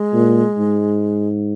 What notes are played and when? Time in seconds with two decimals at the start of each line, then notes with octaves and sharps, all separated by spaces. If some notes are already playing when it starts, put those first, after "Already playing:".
Already playing: G#3
0.14 A#2
0.58 G#2